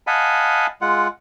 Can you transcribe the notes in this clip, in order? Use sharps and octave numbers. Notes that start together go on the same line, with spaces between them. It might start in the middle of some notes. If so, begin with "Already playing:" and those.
D#5 F5 F#5 G#5 A5 B5
G#3 F4 F#5